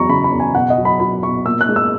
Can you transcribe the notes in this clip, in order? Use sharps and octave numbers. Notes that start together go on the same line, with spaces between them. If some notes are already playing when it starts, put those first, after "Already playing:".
Already playing: E2 F#3 A#5 C#6
C#3 B5
B5
E2
G#5
B2 F#5
D#5
F#3
B5
F#3 B5
B2 C#6
A#2 E6
F#6
G#3
E6